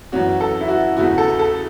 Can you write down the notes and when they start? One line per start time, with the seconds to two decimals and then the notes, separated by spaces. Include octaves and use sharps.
0.12 F#2 E3 C#4 F#4
0.41 A4
0.61 E4
0.68 F#4
0.96 E2 C#3 A3 E4 F#4
1.18 A4
1.39 A4